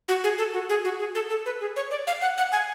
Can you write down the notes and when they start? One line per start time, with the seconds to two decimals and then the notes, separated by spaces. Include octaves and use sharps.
0.08 F#4
0.24 G#4
0.38 A4
0.53 F#4
0.69 G#4
0.85 F#4
0.99 G#4
1.15 A4
1.30 A4
1.46 B4
1.61 G#4
1.76 C#5
1.91 D5
2.07 F5
2.21 F#5
2.38 F#5
2.52 G#5